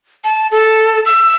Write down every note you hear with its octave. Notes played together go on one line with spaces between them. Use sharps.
A5
A4
E6